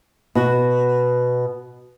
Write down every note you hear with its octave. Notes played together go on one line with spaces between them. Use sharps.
B2 F#4